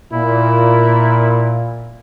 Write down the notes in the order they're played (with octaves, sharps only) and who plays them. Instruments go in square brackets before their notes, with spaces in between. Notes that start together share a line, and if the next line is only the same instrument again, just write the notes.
[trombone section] A#2 [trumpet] E4